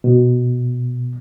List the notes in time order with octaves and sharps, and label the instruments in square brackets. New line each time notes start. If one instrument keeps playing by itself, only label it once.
[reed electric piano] B2